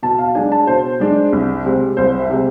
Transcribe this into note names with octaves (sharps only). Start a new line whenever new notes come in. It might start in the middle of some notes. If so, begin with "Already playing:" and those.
B2 A5
F5
G#3 D4 G#5
A5
B2 C5
G#3 D4
C2
C3 G#3 C4
C2 C5
E5
C3 G#3 C4